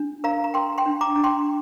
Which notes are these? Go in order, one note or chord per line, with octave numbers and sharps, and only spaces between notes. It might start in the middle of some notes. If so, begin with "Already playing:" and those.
Already playing: D4
A#4 F5 A#5
A#5
A#4 G5 C6
G5 C6
D4
A#5 D6
D4
G5 C6